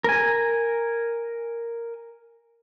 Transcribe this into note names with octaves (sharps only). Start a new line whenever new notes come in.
A#4 G#5